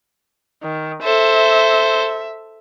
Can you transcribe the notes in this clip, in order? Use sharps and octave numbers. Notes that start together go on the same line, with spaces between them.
D#3
A4 C5 E5